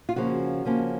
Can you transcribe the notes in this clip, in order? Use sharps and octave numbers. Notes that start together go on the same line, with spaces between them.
F4
C#3 F3 A#3 C#4 F#4
C#3 F3 A#3 C#4